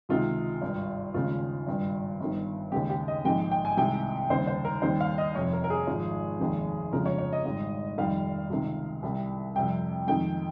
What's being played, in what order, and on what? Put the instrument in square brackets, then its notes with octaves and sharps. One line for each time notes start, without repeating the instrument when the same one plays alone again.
[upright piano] C#2 C3 D#3 G#3 F4
G#1 G2 G3
D#2 C#3 G#3 F4
G#1 G2 G3
G1 G2 D#3
D#2 C#3 G#3 G4
G4
D#5
A#1 G#2 D#3 G#3 G5
G5
G#5
C2 C3 D#3 G#3 G5
D#2 C#3 G3 C5
C5
A#4
D#2 D#3 G3 C5
F5
D#5
F1 F2 C3 C#5
A#4
A#4
G#4
G#1 G#2 F3
F1 D#2 D#3 G#3
G1 F2 C#3 F3 G#3 A#4
C#5
C#5
D#5
G#1 G#2 G3
F1 F2 D#3 G3 F5
C#2 C3 D#3 G#3
C2 C3 G3
F2 C3 G3 G5
F2 D#3 G#3 G5